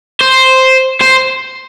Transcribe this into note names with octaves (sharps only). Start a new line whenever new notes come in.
C5
C5